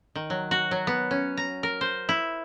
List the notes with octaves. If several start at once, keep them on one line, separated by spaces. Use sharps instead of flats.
D#3
F#3
F#4
F#3
B3
C#4
A#5
A#4
C5
E4